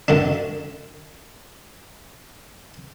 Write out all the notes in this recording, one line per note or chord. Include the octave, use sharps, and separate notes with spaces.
F#2 D3 D4